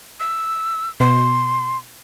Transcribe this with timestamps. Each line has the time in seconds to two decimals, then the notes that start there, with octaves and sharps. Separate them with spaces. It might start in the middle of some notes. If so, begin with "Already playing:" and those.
0.20 E6
1.00 B2 C6